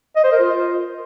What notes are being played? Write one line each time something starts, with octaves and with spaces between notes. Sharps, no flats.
D#5
C5
A#4
F4